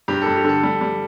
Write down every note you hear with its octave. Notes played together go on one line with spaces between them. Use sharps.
G2 G4
G2 A4
G4
D3 A4
G3
G3